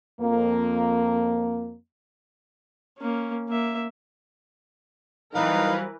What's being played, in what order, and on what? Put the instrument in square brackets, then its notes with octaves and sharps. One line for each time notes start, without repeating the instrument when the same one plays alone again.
[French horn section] F2 A#3
[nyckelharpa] A#3 C#4
A#3 E5
[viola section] E3 A#4 B4 [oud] F#3 G3 C4 [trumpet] D#4 [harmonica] F5